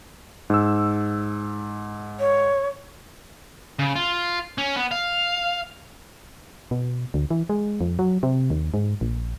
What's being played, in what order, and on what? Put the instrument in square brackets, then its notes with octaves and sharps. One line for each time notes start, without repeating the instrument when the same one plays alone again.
[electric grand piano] G#2 E6
[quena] C#5
[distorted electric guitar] C#3
F4
C#4
B3
F5
[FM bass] B2
D2
E3
G#3
F2
F#3
C3
D#2
G#2
A#1